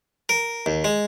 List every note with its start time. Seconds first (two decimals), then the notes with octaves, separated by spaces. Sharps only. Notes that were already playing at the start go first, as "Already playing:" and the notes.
0.29 A#4
0.66 D#2
0.84 G#3